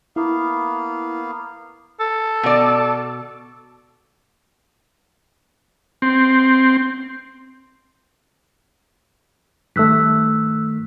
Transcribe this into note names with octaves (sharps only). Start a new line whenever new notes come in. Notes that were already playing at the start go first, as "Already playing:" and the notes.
A#3 B3 E4 F5
A4
B2 D5
C4
G2 D#3 A3 E6 F#6 B6